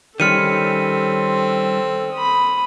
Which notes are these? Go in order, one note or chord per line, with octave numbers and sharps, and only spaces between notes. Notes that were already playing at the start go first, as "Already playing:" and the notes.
D#3 G3 C4 C#4 A4 F6 C#7 D#7
B5 D#6